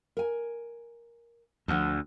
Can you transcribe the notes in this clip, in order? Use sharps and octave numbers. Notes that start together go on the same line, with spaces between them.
A#4 G#5
D2 F3 F#5